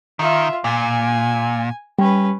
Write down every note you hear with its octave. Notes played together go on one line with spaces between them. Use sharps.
D#3 F4 E5
A#2 G#5
G3 C#4 B4